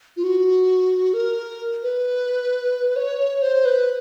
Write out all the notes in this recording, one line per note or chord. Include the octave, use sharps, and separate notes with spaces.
F4
F#4
A#4
B4
C#5
C5
B4